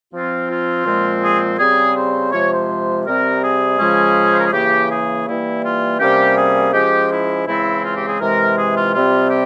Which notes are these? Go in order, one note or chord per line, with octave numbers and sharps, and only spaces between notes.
F3 C4 F4
F4
A#2 F3 G#3 C4
G#4
C#3 G3 C4 G#4
C5
C3 F3 G#3 C#5
C5
C3 G3 C4 A#4
G#4
C#3 F3 G#3 C#4
C5
A#4
G#4
C#3 E3 A#3 G4
G#4
E3 G3 A#3 E4
F4
C3 G3 A#3 C#4 G4
G#4
F3 G#3 C#4 G4
E4
C#3 E3 G#3 C4 E4
F4
G4
G#4
C3 E3 G#3 A#4
G#4
F4
C3 G3 C4 F4
G4